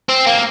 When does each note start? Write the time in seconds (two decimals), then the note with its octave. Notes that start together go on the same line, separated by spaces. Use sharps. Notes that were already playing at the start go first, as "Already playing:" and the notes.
0.09 C4
0.27 A#3